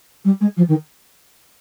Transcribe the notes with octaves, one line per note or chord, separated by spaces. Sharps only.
G3
G#3
F3
D#3